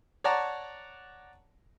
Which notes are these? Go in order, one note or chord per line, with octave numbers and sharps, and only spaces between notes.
C#5 D5 F#5 A5 A#5